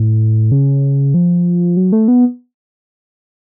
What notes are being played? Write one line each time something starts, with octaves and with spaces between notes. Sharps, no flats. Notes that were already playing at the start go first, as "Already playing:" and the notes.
Already playing: A2
C#3
F3
F#3
A3
B3